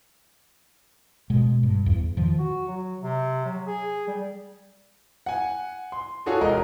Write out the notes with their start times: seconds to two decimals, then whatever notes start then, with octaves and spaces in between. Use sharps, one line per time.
1.30 B2 G#3
1.63 G2
1.86 E2
2.17 D#3 F3
2.39 F#4
2.68 F#3
3.02 C3
3.45 F#3
3.67 G#4
4.07 G3
5.26 F#5 G#5
5.92 C6
6.26 D4 F4 F#4 G#4 A4 C#5
6.41 E1 A#4 D#5